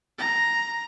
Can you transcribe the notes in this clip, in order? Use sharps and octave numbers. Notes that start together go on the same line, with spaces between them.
A#5